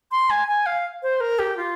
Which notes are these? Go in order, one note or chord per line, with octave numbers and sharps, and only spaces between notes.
C6
G#5
G#5
F5
C5
A#4
G4
F4